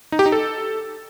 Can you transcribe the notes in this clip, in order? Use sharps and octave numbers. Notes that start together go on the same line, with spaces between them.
D#4
G4
D#4
A4